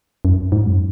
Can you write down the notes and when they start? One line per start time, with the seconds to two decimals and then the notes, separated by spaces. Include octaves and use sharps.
0.25 F#2
0.52 G#2
0.65 F#2